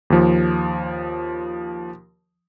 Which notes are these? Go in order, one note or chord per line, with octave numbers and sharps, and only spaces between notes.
D#2 F3